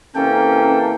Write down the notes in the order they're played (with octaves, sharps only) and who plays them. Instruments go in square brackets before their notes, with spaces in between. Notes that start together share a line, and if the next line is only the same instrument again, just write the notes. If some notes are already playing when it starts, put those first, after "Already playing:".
[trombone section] C3 E3 A#3 [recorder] C#4 [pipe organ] A4 G5